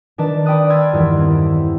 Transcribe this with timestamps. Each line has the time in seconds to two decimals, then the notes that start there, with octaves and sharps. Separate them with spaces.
0.18 D#3 D4 B4 A5 E7
0.45 D5 G5 B5 D#6 F#6
0.69 C6 E6 F6 G#6 A6 B6
0.93 E2 G2 D#3 E3
1.17 C4
1.31 E4